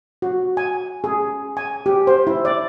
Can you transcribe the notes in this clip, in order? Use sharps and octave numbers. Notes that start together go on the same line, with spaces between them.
F#4
G#5
G#4
G#5
G4
C5
E4
D5